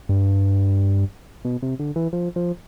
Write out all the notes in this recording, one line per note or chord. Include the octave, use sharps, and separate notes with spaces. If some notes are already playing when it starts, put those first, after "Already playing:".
G2
B2
C3
D3
E3
F3
F3